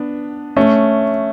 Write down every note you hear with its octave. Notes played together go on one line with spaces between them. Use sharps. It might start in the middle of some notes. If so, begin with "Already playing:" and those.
Already playing: B3 D4
A3 C#4